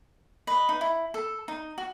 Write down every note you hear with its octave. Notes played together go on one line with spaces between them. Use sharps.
B4 D#5
D#4
E4
A4
D#4
F#4